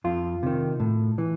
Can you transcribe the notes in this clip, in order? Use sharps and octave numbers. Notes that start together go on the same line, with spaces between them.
F2 F4
C3 D#3
A2
E3